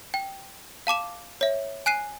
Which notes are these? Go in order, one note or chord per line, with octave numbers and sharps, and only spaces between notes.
G5
F5 A5 D6 E7
C#5 E5
G#5 F#6 C7 D#7